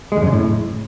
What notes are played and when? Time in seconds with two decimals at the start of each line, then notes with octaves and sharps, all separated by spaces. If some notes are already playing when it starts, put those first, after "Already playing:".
0.12 G#3
0.17 E2
0.22 F#2
0.27 C#3
0.32 A2